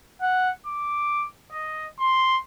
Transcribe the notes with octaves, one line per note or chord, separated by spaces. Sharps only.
F#5
D6
D#5
C6